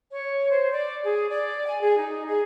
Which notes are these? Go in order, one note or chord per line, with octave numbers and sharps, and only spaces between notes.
C#5
C5
D5
G#4
D5
G#5
G#4
D#4
G#4